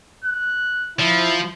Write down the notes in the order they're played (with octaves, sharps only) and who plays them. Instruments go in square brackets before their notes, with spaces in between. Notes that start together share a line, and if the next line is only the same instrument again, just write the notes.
[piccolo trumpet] F#6
[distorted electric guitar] F3 [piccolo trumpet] E4